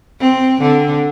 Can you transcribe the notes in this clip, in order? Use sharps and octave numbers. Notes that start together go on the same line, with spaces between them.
C4
D3